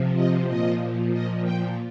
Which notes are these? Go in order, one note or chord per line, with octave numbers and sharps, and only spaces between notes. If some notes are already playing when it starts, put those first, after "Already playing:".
Already playing: C3 F3
D#5
A#2 F3 D#5
A#2 F3 D#5
G5